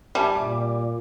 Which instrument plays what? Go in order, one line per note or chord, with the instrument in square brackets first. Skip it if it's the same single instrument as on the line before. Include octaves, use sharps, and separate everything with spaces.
[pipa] G3 [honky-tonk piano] E5 G#5 A5
[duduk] A#2 [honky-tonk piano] D6